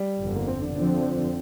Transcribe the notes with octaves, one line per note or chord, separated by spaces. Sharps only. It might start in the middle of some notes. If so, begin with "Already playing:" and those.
Already playing: G3
G1 F2 D3
A#3
C4
D4
F2 D3 F3 C4 D4